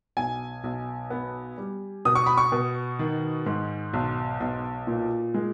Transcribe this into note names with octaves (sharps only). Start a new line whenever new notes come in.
B1 G#5
B1
B3
G3
B2 D#6
C#6
B5
C#6
B2
D#3
G#2
B1
B1
A#2
G#3